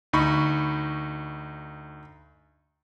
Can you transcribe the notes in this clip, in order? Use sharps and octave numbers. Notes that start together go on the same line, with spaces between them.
D2 D#4 B5 C#6